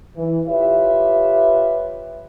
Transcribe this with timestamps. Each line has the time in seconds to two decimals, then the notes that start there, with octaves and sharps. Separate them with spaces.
0.16 E3
0.48 F4 G4 B4 C#5 E5